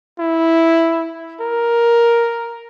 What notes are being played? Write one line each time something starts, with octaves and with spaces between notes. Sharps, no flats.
E4
A#4